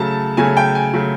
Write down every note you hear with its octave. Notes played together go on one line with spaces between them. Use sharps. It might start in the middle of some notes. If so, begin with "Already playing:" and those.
Already playing: C#3 F#3 A3 A5
C#3 F#3 A3 G#5
G5
G#5
C#3 F#3 A3